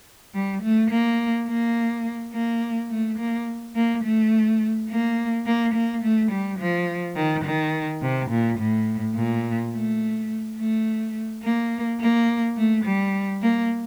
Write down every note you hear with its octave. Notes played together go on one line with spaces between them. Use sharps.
G3
A3
A#3
A#3
A#3
A3
A#3
A#3
A3
A#3
A#3
A#3
A3
G3
F3
D#3
D#3
C3
A#2
A2
A#2
A3
A3
A#3
A#3
A3
G3
A#3